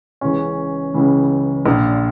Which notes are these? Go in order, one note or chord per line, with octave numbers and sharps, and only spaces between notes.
C#2 C#3 E3 C#4
C#2 C#3 E3
A#1 A#2